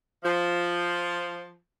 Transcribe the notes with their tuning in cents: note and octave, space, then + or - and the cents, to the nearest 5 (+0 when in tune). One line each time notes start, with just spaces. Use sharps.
F3 +0